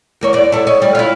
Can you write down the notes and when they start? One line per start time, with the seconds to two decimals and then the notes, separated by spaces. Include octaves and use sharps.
0.21 E2 A#3 C#5
0.33 E2 D5
0.52 E4 A4
0.67 C#5 D#5
0.82 G3
0.95 E4 F4